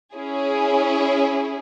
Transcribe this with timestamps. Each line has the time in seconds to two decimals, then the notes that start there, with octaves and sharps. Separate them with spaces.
0.15 C#4 E4 G#4